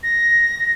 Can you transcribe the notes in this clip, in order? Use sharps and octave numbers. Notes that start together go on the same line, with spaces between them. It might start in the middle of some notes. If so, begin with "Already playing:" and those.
A#6